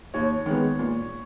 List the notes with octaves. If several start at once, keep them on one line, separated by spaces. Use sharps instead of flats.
D#2 C#5
D#3 G#3 B3
A#2